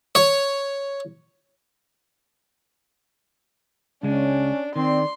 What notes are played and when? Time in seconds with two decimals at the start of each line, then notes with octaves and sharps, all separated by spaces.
0.15 C#5
4.03 C#2 G#3 C#4 D4
4.76 D#3 C4 D5 C6